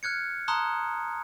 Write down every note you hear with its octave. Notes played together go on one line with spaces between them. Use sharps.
F6 F#6 G#6 C#7
A5 A#5 C6 D#6 F#6